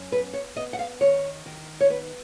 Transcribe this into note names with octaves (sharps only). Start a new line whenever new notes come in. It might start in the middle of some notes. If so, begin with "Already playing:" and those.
Already playing: F#2
B3 B4
C#5
B3 D#5
F#5
F5
D#3 C#5
D#3
C#5
B3 B4